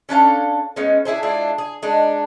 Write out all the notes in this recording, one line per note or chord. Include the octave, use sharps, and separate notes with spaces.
C#4 D4 A4 F5
G#3 B3 C#4 D#4
D4 E4 G#4 C5
G#3 D4 E4 F4
G#4
G#3 D4 D#4